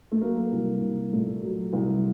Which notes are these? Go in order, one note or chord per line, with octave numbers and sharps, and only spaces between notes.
A3
F#3 A#3
C2
C2
A#2 A3
F#3
C2